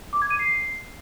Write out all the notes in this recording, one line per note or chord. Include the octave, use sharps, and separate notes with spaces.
D6
G#6
D#7
C7